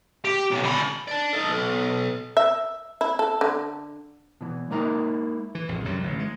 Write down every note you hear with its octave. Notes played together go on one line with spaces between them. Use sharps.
G4
B1
D3 B5
D5 A5
D#4 A4
B1
E5
E4
A4
D3
B2 E3
G#3 A#3 D#4 E4 A#4 D#5
E3
A#1 F2
C2 F#2 F#3 G3
A1 D3
G#3